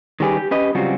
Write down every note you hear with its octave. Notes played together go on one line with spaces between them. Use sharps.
D#3 G3 C#4 G4 G#4 B4
G4
C#4 G4 B4 D#5
C#3 F#3 G3 C4 F4 F#4